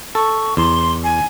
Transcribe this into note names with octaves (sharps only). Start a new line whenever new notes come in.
A4 C#6
E2 C6
G#5